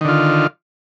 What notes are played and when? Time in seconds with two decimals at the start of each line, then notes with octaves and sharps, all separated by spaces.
0.01 D#3
0.05 D3
0.09 F4